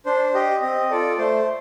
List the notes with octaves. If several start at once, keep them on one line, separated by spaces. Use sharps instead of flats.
D4 C5
G4 D#5
C4 D#5
F4 A4 D5
A3 C5